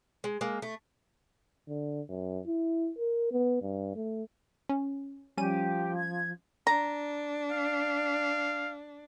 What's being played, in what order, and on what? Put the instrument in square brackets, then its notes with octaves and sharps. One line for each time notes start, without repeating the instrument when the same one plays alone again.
[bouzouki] G#3
G#3 A#3
A3
[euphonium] D3
F#2
E4
A#4
B3
G2
A3
[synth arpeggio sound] C#4
[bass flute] F3 [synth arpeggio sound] G3 C#4 D#7 [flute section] G4
[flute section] G#6
[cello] D4 [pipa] A#5
[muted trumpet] F5